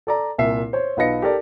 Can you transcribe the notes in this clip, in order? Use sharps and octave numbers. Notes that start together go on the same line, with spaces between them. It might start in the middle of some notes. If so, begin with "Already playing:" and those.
A4 D5 A#5
C2 A#2 E5 C7
C5 C#5
B1 F4 B4 D#5 A#6 C#7
G4 A4 A#4 D5